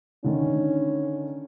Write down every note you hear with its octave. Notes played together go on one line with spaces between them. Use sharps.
D3 D#3 C#4